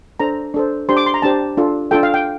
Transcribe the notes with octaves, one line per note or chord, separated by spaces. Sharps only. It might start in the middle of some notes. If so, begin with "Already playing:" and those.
D4 A4 C5 A#5
D4 A4 C5
D4 G4 C5 C6
D6
C6
A#5
D4 G4 C5 A5
D4 F4 A4
D4 F4 A4 G5
F5
G5